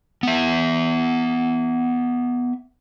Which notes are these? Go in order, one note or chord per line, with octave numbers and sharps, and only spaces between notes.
B3 E5